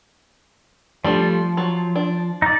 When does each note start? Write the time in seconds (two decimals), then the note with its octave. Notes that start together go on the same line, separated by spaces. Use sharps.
1.04 F3 G3 A3 D4
1.57 F#3
1.96 D4
2.42 D#4 D5